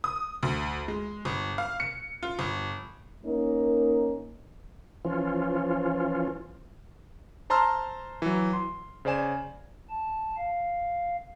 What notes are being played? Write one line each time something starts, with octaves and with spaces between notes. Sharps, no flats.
D#6
D2
G#3
G1
F5
C#7
F4
G1
A#3 C#4 D#4 A#4
E3 F3 C#4 F4
C5 A5 A#5 C6 E6 F6
E3 F#3
C6
C#3 C5 D5 G#5 E7
A5
F5